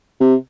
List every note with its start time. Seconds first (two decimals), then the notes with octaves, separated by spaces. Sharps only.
0.20 C3